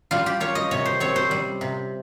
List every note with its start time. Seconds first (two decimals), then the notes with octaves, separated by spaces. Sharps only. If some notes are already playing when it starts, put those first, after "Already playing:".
0.11 G3 F4
0.26 G4
0.40 F4 C#5
0.55 D#5
0.71 C3 C#5
0.86 C5
1.00 C4 C#5
1.16 C5
1.31 G3
1.61 C3